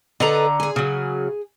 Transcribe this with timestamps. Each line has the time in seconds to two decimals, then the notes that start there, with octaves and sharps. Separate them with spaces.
0.20 D3 A4 B4 D#5 A#5
0.60 G#4 G#5
0.76 C#3 F#3